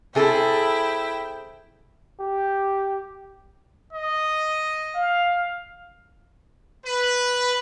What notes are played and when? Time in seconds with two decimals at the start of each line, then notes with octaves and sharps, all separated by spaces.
0.15 C3 E4 G#4 A4 G5
2.20 G4
3.93 D#5
4.95 F5
6.86 B4